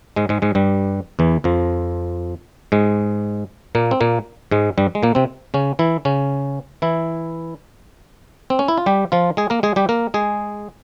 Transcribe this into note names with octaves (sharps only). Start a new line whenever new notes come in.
G#2 G#3
G#2 G#3
G#2 G#3
G2 G3
E2 E3
F2 F3
G#2 G#3
A#2 A#3
C4
A#2 A#3
G#2 G#3
G2 G3
G#3
A#2 A#3
C3 C4
C#3 C#4
E3 E4
C#3 C#4
E3 E4
C4
C#4
E4
F4
G3 G4
F3 F4
G#3 G#4
A#3 A#4
G#3 G#4
G3 G4
A#3 A#4
G#3 G#4